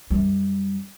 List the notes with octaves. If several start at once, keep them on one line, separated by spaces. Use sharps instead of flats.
F#2 G3